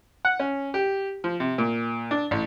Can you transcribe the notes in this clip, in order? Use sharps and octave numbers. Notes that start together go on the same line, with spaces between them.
F#5
C#4
G4
F3
C3
A#2
D4
A1